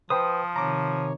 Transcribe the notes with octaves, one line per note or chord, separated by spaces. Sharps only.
F3 B4 C5 G5 D#6
C3 D#3 C#5 A#5 D6